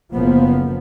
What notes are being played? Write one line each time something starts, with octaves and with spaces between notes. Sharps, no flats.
F#1 F3 A#3 B3